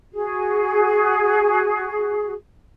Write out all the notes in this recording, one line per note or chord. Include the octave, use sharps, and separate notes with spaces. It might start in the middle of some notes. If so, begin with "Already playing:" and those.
F#4 G#4